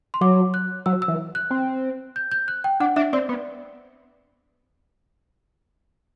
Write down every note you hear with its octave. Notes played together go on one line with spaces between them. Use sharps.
C6
F#3 D6
F#6
F#3 E6
E6
E3
F#6
C4
G6
G6
F#6
G5
D4 F#5
D4 E5
C4 D5
B3